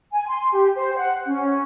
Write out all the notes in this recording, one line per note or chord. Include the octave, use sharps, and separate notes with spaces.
G#5
C6
G4
C5
F#5
C#4